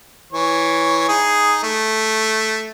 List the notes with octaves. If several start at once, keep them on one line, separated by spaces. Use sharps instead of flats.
E3 C#5
D#4 G#4
A3